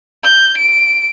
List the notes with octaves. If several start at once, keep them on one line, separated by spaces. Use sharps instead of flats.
G6
D7